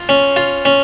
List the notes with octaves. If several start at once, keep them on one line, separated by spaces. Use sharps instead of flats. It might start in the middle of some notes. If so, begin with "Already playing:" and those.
Already playing: F4
C#4
F4
C#4